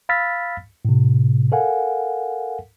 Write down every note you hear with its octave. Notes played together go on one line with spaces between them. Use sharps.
F5 B5 E6 F6 A6 B6
A2 C3
A4 A#4 F5 F#5 G#5